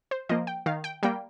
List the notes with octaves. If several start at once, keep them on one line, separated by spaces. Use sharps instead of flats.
C5
F3 A#3 D#5
G5
D#3 F5
G5
G3 A#3 G5